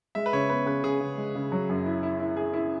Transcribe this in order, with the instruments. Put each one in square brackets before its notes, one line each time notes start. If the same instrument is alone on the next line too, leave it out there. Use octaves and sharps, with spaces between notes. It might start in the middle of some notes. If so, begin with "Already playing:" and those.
[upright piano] G#3 [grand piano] E5
[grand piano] B4
[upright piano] C#3 [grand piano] C#5
[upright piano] B3 [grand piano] B4
[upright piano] C#3 [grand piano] B4
[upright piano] C#3 [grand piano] G#4
[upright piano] C#3
G#3
C#3
F#3
F#2
E4
E4
E4
G#4
E4